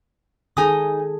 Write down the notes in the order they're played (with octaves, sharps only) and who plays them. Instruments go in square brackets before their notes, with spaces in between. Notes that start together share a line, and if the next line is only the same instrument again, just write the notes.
[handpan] D#3 G#4 A4 [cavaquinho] D#4 G#5 D#6